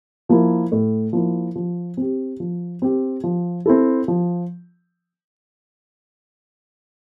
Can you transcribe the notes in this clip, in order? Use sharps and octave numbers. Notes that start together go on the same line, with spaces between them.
F3 A#3 E4
A2
F3 A#3 E4
F3
C4 G4
F3
C4 G4
F3
C4 E4 A4
F3